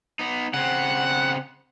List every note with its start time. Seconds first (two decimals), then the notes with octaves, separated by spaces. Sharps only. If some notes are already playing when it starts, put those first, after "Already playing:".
0.19 B3 D#4
0.54 C#3 C4 F#5